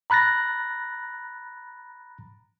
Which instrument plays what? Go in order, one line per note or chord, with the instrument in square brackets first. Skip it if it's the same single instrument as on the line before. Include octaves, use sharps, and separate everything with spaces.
[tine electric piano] A#5 B5 F#6 A6 A#6